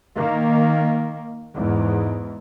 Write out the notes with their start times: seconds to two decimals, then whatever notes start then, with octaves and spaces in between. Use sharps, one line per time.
0.14 D#3 A#3
1.54 E2 G#2